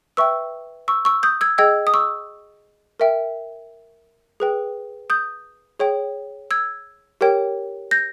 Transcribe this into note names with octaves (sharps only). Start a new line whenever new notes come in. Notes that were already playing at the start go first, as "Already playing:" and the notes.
B4 E5 G5 C#6 E6
C#6 E6
C#6 E6
D#6 G6
E6 G#6
G#4 D#5 G5 E6 G#6
D#6
C#6 E6
A#4 E5 G5
G#4 B4 G5
D#6 G6
G#4 C#5 G5
E6 G#6
G4 A#4 C#5 G5
G6 A#6